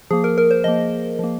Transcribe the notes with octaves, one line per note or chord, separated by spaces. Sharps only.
F3 A#3 G#4
A#4
A#4
C5
F3 A#3 D#5
F3 A#3